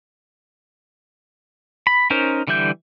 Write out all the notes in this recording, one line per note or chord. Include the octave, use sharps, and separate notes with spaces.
B5
C#4 D#4 A#4 C5
D3 E3 G3 E5 G6